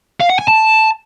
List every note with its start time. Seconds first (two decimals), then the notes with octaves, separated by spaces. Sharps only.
0.20 F5
0.29 F#5
0.39 G#5
0.48 A5